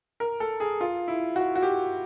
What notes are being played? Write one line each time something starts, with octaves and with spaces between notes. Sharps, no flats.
A#4
A4
G#4
F4
E4
F#4
F#4
G4